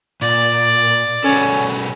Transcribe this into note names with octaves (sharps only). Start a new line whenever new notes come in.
A#2 D5
B2 C#4 G#4 A4